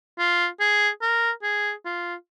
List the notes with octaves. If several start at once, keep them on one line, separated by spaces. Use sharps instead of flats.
F4
G#4
A#4
G#4
F4